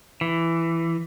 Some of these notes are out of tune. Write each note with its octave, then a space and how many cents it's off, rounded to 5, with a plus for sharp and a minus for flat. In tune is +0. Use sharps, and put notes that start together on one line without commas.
E3 +10